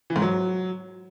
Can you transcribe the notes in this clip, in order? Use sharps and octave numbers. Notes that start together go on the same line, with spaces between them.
E3
G#2
F#3